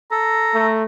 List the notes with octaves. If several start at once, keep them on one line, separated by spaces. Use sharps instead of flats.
A4 A#5
A3